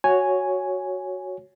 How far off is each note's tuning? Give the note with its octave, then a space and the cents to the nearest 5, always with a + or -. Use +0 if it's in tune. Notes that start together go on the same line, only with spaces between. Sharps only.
F#4 +0 C#5 +0 G#5 +0